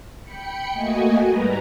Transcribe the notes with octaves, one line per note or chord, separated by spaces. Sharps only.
G5 B5 C#7
A3 A#3 F#4 D#5 G#5
G#2 G3 B4 A#5